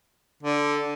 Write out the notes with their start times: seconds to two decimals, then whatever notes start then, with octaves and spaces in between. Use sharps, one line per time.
0.43 D3